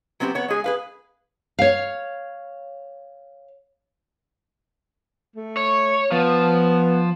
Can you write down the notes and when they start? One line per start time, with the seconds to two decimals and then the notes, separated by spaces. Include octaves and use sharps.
0.20 F#3 B3 C4 E4 G4
0.35 B3 C#5
0.48 G#3 G#4
0.64 G#4 B4 F5
1.59 C#5 F5
5.36 A3
5.57 C#5
6.11 F3 B3